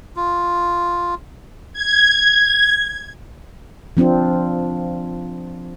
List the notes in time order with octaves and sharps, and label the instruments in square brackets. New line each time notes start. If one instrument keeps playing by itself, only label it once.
[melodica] F4
[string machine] G#6
[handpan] F3 C4 D4 F4